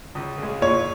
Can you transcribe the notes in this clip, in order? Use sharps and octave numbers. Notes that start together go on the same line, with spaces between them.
C#2
C#3 G#3
A#2 C#5